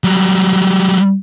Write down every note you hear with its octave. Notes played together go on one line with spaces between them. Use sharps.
F#3 G3